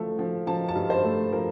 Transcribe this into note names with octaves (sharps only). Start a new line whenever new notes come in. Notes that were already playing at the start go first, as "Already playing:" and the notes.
Already playing: F3 A3
F3
F3 A5
A5
G2
C5
A3
F3 A#4